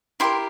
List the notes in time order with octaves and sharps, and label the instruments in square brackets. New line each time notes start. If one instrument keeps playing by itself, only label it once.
[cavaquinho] E4 G4 A#4 C6